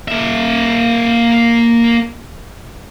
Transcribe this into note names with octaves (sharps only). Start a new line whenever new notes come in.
A#3 E5